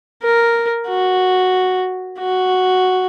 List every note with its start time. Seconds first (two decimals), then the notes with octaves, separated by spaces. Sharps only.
0.23 A#4
0.88 F#4
2.19 F#4